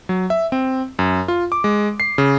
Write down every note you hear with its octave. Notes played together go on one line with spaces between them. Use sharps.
F#3
E5
C4
F#2
F4
D6
G#3
C7
C#3